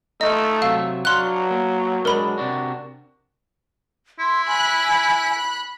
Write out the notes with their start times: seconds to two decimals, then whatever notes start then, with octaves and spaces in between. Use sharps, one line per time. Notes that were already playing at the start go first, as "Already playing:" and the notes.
0.21 A3 D#4 F4 D#5
0.62 C3 F#3 E5 F5
1.05 F#3 D4 F5 F#5 C6 F#6
1.51 A#3
2.05 G#3 D4 A#4 B5
2.38 C3 D4 F#4
4.19 E4 C6
4.48 G#5 B5 F#6